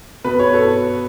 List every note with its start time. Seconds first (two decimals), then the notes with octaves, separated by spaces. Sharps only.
0.24 B2 B4
0.39 C#5
0.54 A4